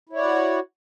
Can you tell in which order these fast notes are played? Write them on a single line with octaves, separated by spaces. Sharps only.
E4 C#5 D5 F#5 F#4